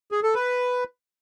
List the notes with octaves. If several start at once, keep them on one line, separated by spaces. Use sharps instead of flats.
G#4
A4
B4